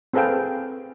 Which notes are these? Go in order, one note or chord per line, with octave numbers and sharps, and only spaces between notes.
C4 G#4 A4 B4 F5 G5